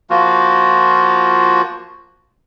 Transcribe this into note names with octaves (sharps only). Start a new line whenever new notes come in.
F3 A#3 F4 F#4